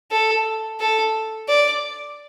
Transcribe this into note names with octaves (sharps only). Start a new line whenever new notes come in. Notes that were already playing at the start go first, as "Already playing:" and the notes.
A4
A4
D5